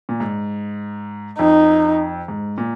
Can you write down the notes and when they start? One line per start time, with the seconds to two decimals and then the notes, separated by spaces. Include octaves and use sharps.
0.09 A#2
0.20 G#2
1.39 F2 D#4
2.28 G#2
2.58 A#2